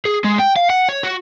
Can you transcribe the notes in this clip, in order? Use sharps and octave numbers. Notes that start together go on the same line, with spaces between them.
G#4
G#3
G5
F5
F#5
C#5
F#4